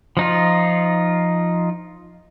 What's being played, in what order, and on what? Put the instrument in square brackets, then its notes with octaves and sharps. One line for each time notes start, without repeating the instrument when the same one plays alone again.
[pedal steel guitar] F3 D#4 F4